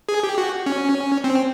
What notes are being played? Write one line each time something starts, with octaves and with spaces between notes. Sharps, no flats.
G#4
G4
F#4
C#4
C4